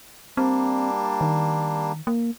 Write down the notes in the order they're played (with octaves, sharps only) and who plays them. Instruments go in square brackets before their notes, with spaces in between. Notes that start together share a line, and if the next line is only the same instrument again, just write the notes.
[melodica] G3 A#3 D4 [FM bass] C4
[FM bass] D#3
A#3